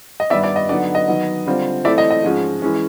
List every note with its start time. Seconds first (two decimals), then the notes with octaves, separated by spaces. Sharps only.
0.20 D#5
0.30 G2 D#3 G3 B3 D#4 D5 E5
0.44 D5
0.56 D#5
0.69 D3 F#3 B3 D#4 D5
0.95 D#5
1.08 D#3 F#3 B3
1.46 D3 G3 C4 F4
1.85 E3 A3 C4 E4 D5 E5
1.98 D#5
2.11 D#5
2.23 G#2 F3 G#3 C#4
2.62 E3 G#3 C#4